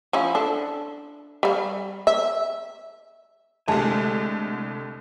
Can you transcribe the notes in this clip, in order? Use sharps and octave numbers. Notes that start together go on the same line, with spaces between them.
F3 C#4 E4
D4 A4
G3 F5
E5
C2 D3 G#3 A3 G4 G#5 A5